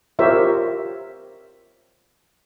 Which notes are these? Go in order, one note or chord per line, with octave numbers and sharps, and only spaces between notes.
F4 G4 A#4 C5 C#5 E5